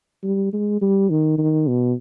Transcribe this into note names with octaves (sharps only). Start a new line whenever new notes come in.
G3
G#3
G3
D#3
D#3
B2